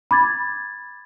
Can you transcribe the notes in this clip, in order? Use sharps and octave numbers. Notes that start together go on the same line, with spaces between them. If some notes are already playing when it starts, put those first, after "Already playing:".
B5 D6 G#6 A6